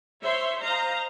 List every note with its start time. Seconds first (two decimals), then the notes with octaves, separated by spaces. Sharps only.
0.22 C5 C#5 E5 C6
0.61 C5 D#5 F5 A#5